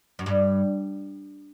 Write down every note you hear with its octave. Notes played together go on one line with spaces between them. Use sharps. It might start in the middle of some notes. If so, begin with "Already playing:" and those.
F#2
G2